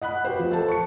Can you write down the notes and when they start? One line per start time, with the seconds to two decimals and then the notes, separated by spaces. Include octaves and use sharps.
0.02 D#5 F#5 B5 F#6
0.25 F#4 G4 B4 C5
0.39 F3
0.51 A4 A5
0.68 C#6 C#7